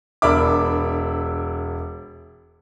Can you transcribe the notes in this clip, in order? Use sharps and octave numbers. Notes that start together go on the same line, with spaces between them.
E1 D4 A#4 E5 B5 D6